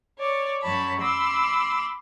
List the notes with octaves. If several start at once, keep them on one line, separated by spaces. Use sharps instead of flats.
C#5 D5
F#2 F#3 C#5 A5 B5
B5 C6 D6 E6